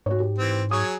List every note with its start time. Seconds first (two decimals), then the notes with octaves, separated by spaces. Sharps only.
0.06 G#2 F#4 C#5
0.20 G4
0.39 E3 C4
0.71 F#3 G#4 C#5 D#6